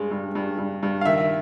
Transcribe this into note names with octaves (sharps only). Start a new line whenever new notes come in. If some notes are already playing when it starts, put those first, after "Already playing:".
Already playing: G2 G#3
G2
G2
G2
G2
F5
D#3 E5
E5